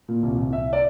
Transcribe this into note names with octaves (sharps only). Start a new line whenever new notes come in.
A#2
C2
C2
C2 E5
D5